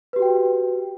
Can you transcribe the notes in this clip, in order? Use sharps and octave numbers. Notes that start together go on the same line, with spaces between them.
F#4 G4 B4 G5